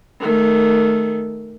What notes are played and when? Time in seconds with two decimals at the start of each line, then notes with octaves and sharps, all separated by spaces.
0.20 D#3 A3